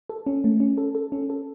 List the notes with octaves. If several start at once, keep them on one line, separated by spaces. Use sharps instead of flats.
A4
C#4
A3
C#4
A4
A4
C#4
A4